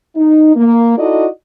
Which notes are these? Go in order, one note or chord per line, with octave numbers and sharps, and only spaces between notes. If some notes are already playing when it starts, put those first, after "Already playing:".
D#4
A#3
D#4 E4 F#4 A4 D5 D#5